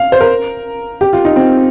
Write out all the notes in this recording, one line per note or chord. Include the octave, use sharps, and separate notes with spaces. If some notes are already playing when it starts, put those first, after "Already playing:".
Already playing: F5
C5
A#4
G4
F4
D#4
C4